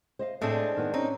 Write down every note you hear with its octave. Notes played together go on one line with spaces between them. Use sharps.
C5 D#5 F5
A2 G#3 A3 C4 D4
G2 D#3 B3
C4 C#4 D#4